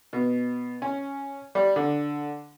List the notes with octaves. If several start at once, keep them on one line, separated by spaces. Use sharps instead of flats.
B2
C#4
G3
D3